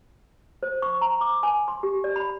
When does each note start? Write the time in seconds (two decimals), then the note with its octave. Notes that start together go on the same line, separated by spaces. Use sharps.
0.63 C5
0.82 C#6
1.01 A#5
1.21 D6
1.43 G#5
1.68 C6
1.83 G4
2.04 D5
2.16 B5